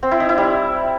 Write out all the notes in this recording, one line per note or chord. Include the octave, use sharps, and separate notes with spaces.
C4
E4
D#4
E4
G3